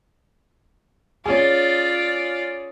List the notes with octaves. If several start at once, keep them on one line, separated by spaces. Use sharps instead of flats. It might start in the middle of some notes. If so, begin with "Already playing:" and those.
C#4 F4 G#4 D5